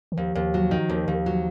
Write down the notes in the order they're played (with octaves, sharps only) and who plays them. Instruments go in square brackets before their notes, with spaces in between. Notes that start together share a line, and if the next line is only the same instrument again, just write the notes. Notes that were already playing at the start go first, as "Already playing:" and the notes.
[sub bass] D#3
[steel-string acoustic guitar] D#2 [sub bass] F3
[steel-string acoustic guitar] D#2
F#3
D#3
D#2
D#2
F#3